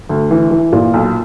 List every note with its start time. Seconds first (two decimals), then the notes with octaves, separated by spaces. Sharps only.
0.09 D2
0.31 E3
0.51 E3
0.72 A#2
0.94 B1